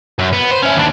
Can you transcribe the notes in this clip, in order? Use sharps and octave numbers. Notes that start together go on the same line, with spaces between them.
F#2
B3
C5
C#4 E4
D#2 D4